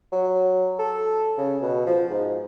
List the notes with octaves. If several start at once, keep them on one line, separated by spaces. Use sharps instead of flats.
F#3
A4
C#3
B2
F3
G#2